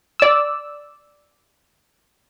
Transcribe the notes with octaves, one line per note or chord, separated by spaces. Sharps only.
D5 E6